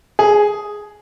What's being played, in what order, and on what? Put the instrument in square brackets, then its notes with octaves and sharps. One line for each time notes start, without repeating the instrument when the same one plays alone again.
[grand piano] G#4